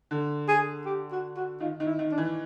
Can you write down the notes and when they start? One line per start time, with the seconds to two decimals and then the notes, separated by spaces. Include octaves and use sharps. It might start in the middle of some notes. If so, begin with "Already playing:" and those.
0.11 D3
0.48 G#4
0.86 G4
1.12 F#4
1.36 F#4
1.60 D#3 F4
1.80 D#3
1.86 E4
1.99 D#3
2.11 D4
2.18 E3